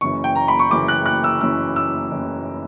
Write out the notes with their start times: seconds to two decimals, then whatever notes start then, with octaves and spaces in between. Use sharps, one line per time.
0.01 F#1 F#2 E3 C#6
0.24 G5
0.35 A#5
0.48 B5
0.59 C#6
0.71 F#1 F#2 E3 D6
0.88 F#6
1.06 F#6
1.24 E6
1.41 F#1 F#2 E3 E6
1.76 E6
2.12 F#1 F#2 E3